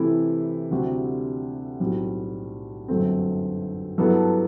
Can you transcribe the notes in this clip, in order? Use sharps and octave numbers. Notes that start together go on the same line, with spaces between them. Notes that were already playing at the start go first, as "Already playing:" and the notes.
Already playing: C3 E3 A3 C4 E4
D2 C3 G3 C4 F#4
B1 A2 G3 C4
G1 F#2 F#3 A3 C4
G2 F#3 B3 E4 A4